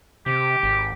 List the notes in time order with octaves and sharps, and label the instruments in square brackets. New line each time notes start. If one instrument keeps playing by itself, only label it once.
[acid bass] C3 [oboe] G4
[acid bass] G#1